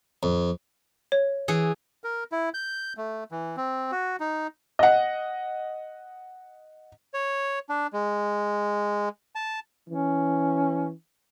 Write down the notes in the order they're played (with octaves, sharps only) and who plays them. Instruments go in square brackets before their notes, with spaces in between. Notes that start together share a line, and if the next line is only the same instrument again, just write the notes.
[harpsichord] F2
[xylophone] C#5
[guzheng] E3 G#4
[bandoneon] A#4
E4
G6
A3
E3
C4
F#4
D#4
[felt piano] D#5 F#5
[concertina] C#5
D4
G#3
A5
[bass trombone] E3 [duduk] C#4